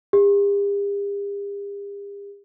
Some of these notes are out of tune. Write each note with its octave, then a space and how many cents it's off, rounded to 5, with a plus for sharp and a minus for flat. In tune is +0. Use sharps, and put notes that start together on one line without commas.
G4 +45